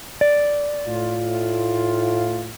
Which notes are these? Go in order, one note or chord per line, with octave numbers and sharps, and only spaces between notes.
D5
A2 F4